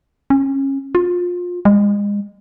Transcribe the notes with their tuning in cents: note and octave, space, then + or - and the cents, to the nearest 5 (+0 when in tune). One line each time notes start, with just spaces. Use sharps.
C#4 -25
F4 +25
G#3 -30